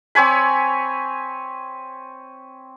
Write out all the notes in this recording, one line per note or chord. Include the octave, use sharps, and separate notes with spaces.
C4 C#5 G#5 B5